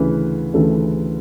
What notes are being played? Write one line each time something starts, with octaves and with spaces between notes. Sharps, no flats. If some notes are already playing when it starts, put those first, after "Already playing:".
Already playing: D2 C#3 E3 B4
D2 C#3 E3 A4